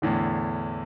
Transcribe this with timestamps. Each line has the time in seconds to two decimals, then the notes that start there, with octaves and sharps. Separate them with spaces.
0.02 E2 A2 D3